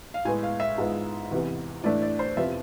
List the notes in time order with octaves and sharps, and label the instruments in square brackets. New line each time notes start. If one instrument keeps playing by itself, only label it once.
[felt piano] F5
[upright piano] A2 G#3 B3 [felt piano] G#5
[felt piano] F5
E5
[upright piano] G#2 G#3 B3 F4
E2 C3 E3 B3
[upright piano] A2 E3 A3 D4 [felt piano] D5
[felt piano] D5
C5
[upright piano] F2 C3 F3 B3 F4 [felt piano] E5